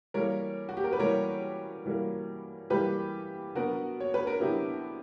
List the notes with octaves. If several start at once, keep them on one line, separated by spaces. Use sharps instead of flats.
E3 G3 A#3 A#4 C#5
F#4
G4
A#4
B4
E3 G3 A#3 A#4 C#5
E3 G3 A#3
E3 G3 A#3 G4 B4
D3 F#3 B3 F#4 A#4
C#5
B4
A#4
D3 F#3 B3 E4 G4